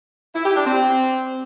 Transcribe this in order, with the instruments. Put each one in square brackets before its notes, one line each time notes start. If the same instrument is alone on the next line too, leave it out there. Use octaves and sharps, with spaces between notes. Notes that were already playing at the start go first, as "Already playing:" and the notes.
[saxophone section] E4
G4
D4
C4